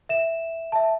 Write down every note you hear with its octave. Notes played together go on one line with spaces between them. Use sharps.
E5 E7
E5 A5